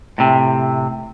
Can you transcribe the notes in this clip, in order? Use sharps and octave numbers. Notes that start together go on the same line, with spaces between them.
A2 C3